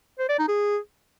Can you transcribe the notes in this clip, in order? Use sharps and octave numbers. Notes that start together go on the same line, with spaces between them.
C5
D5
D#4
G#4